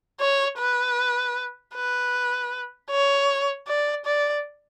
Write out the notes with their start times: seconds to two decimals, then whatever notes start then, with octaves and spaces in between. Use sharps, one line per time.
0.20 C#5
0.58 B4
1.75 B4
2.91 C#5
3.67 D5
4.05 D5